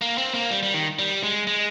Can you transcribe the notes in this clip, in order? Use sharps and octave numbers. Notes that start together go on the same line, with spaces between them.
A#3
C4
A#3
G3
G3
D#3
G3
G#3
G#3